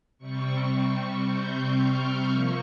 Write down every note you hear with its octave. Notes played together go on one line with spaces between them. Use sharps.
C3 G3 C4 C#6
C#6
G6
F6
C3 F3 A#3 C#6